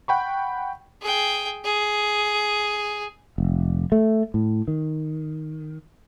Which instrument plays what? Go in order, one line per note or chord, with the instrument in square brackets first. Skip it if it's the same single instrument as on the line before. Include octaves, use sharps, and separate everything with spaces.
[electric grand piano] F#5 G5 B5 C#6
[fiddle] G#4 G5
G#4
[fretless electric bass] F1
A3
A2
D#3